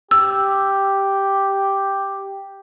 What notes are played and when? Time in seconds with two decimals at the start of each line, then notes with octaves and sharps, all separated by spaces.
0.11 G4 E6